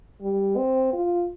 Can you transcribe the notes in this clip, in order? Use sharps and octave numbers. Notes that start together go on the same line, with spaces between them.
G3
C4
F4